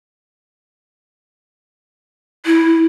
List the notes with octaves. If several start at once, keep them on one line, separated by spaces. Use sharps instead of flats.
E4